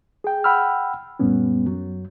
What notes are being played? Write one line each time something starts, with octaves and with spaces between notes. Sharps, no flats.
G#4 G5
F#5 G5 B5 E6 F6
F#2 A#2 G3 B3 C#4
F#2 F#3